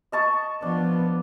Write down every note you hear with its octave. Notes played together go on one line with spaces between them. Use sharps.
D#5 A5 C#6
F3 B3 D4